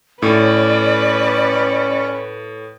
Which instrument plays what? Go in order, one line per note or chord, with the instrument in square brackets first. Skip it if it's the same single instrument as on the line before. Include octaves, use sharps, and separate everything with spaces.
[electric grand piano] A2 [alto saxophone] C#4 [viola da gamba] B4 [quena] D5